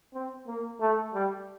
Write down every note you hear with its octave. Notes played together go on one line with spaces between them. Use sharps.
C4
A#3
A3
G3